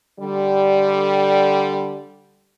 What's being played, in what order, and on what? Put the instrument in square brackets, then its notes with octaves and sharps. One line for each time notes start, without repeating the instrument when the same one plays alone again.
[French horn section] D3 G3